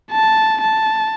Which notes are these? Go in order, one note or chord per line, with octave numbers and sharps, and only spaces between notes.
A5
A5